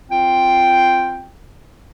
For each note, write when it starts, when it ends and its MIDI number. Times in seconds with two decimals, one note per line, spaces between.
0.10 1.29 60
0.10 1.29 65
0.10 1.29 79